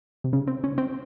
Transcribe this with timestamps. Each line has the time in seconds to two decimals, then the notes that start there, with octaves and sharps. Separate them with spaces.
0.24 C3
0.33 C#3
0.47 C4
0.64 C#4
0.78 C4